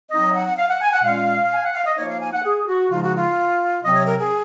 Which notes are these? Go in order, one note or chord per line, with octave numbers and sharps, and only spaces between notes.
F#3 C4 D#4 D#5
F#5
F5
F#5
G#5
F#5
A#2 G#3 C#4 F4 F5
G#5
F#5
F5
D#5
F3 A#3 D#4 C#5
F5
G#5
F#5
G#4
F#4
C#3 F3 G#3 D#4 F4
F#4
F4
C3 F#3 C4 D#5
C#5
A#4
G#4